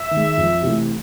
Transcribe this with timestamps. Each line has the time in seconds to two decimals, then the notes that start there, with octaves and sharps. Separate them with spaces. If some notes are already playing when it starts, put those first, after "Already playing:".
Already playing: E5
0.11 D#3
0.16 G#3
0.37 F2
0.62 C3 E3 A3